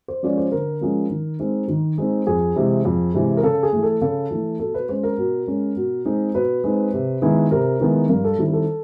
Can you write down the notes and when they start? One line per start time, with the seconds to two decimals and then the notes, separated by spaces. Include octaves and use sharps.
0.08 C5
0.23 F3 G#3 C#4 D5
0.37 C5
0.52 D3 A#4
0.81 F3 G#3 C#4
1.10 D#3
1.40 G#3 C4 D#4
1.68 D#3
1.98 G#3 C4 D#4
2.27 F2 G#4
2.56 C3 E3 G#3
2.85 F2
3.14 C3 E3 G#3
3.37 A#4
3.43 C#3 A4
3.63 G#4
3.73 E3 A3
3.82 A4
4.01 C#3 A4
4.31 E3 A3
4.59 B2 A4
4.74 B4
4.89 G#3 C#4 C5
5.03 A#4
5.18 B2
5.47 G#3 C#4
5.76 B2
6.05 G#3 C4 D#4
6.35 B2 B4
6.64 G#3 C4 D#4
6.93 C3
7.22 D#3 G#3 B3 E4
7.51 C3 A#4
7.80 D#3 G#3 B3 E4
8.09 G2 A#4
8.24 A4
8.39 D#3 G3 C4 E4
8.53 A4